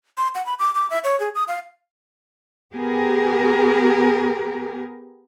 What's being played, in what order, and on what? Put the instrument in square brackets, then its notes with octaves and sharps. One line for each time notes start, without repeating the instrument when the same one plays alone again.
[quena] C6
F#5
B5
D6
D6
E5
C#5
G#4
D#6
F5
[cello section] B3 G4 G#4 A#4